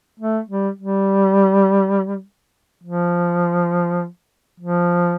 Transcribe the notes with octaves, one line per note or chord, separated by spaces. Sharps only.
A3
G3
G3
F3
F3